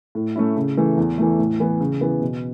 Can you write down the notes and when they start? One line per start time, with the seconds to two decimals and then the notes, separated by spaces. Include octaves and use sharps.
0.15 A2
0.36 A3 C#4 E4
0.56 C#3
0.77 E3 A3
0.97 E2
1.18 E3 A3
1.39 A2
1.60 E3 B3
1.81 C#3
2.01 E3 B3
2.21 B2